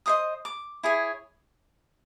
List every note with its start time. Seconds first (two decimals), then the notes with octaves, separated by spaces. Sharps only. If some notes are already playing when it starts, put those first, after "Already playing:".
0.06 G4 C5 D#5 D#6
0.45 D6
0.83 E4 G#4 C#5